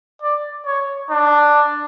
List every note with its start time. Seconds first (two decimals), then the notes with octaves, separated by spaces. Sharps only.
0.22 D5
0.66 C#5
1.11 D4